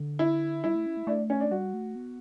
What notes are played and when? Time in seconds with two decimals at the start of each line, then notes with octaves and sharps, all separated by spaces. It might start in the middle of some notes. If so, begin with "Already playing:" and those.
Already playing: D3
0.19 E4
0.64 G3 E4
0.75 A3
0.86 C#4
0.97 A3
1.07 A3 D4
1.30 C#4
1.40 D4
1.51 G3 F#4
1.74 A3
1.95 B3